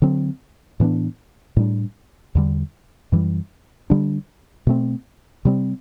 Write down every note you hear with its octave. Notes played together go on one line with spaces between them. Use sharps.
D3 F#3 C4
A2 E3 B3 D4
A2 G3 D4
E2 D3 G3
F#2 E3 G3
D3 G3 D4
B2 A3 C4
C3 G3 C4